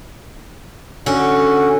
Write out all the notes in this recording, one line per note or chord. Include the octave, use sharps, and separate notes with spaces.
D3 C#4 F#4